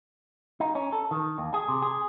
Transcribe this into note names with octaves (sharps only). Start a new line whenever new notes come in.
D#4
C#4
A4
D#3
D#2
G#4
C3
G#4